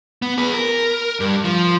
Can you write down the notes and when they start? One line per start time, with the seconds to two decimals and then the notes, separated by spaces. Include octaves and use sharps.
0.22 B3
0.38 G#4 B4
0.54 A#4
1.20 G2
1.44 F3